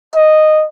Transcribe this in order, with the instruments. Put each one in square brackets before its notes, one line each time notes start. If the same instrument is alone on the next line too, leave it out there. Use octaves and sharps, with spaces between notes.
[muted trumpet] D#5